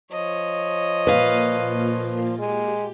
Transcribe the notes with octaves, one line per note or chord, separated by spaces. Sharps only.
F3 C#5 D#5
A#2 A#3 F4 B4 F5
G#3 G4